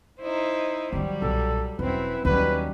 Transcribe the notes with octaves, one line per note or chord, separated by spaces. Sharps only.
D#4 E4 C5
D#3 F#3 G3 D4
B1 A#2 A4
E1 F#2 C4 E4 B4
D#2 F#3 G3 C#4 B4